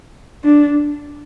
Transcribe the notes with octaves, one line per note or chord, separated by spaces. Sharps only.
D4